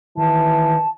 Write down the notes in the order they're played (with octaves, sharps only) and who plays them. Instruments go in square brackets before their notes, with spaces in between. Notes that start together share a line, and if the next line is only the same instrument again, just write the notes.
[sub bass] D#3 [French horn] E3 [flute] A5